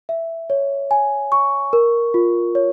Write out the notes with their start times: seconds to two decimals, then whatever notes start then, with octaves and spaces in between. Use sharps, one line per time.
0.09 E5
0.50 C#5
0.91 G#5
1.32 C#6
1.73 A#4
2.14 F4
2.55 C#5